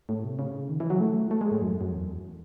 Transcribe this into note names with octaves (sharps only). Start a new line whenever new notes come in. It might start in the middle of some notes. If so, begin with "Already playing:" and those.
A2
C3
C#3
D#3
E3
F#3
A3
A3
G#3
A2
F#2
F#2
E2